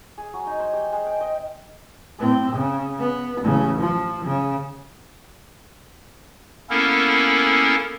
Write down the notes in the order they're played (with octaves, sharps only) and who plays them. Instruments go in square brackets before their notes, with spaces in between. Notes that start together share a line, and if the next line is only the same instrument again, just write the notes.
[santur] G#4
F#3
D#4
C5
G4
G#3
G5
D#5
[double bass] A2 C4
C#3
B3
A1 C#3
F3
C#3
[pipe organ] A#3 B3 C#4 E4 A4 A#4